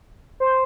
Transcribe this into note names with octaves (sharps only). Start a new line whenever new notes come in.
C5